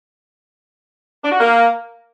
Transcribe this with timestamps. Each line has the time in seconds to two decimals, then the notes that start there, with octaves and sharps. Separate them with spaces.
1.24 D4
1.32 F#4
1.39 A#3